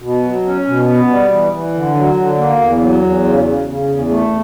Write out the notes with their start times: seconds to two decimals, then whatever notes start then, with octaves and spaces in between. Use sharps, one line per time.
0.02 B2
0.24 F#3
0.46 C#4
0.67 B2
0.87 B3
1.10 G3
1.31 E3
1.53 E3
1.74 D3
1.96 F#3
2.17 D3
2.38 A#3
2.60 E2
2.81 F#3
3.02 E2
3.24 C#3
3.45 C#3
3.67 C#3
3.88 E2
4.09 A3